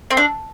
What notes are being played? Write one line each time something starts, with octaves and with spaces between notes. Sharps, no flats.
C4
D4